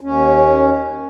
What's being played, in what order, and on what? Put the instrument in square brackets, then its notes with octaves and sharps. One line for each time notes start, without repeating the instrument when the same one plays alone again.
[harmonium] D#2 C#4